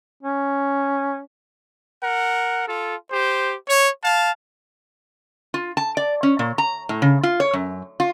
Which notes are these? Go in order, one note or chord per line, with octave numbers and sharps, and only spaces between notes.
C#4
A#4 F#5
F4 A4
G4 C5
C#5
F5 A5
F4
A5
D5
C#4
A#2
A#5
A2
C#3
F4
C#5
F#2
F4